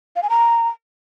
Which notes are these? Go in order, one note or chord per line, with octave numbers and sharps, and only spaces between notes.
F5
G#5
A#5